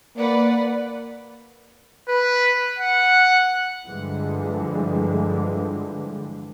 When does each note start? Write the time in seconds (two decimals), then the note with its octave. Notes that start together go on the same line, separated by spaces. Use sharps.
0.18 A#3 B4 D5 F#5
2.08 B4
2.78 F#5
3.86 G2 D3 E3 F3 G3 G#3